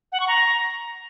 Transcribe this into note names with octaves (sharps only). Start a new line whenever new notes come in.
F#5
C#6
A#5